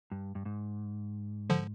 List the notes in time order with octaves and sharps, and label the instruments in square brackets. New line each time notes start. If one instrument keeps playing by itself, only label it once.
[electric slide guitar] G2
G2
G#2
[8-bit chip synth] D3 F3